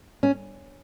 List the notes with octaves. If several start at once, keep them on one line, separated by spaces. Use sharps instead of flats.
C#4